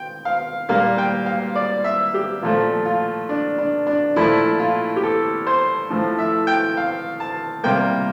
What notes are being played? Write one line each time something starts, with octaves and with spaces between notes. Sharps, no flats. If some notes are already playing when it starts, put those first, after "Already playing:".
Already playing: G5
F5
A#2 G3 A#3 F5
G5
F5
D5
E5
G4
A#2 F3 A3 F4
F4
D4
D4
D4
A#2 F3 A3 E4
F4
G4
A4
C5
A2 F3 A3
E5
G5
F5
A5
C3 G3 A#3 G5